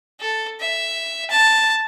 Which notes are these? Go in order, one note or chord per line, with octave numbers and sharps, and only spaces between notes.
A4
E5
A5